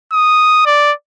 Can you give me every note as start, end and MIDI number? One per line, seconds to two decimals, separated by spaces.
0.13 0.64 87
0.66 0.92 74